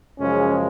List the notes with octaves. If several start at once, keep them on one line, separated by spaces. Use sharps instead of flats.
F#2 C#3 F3 G#3 C#4